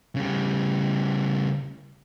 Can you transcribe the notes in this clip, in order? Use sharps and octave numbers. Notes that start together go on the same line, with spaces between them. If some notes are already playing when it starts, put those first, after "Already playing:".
C#3 G3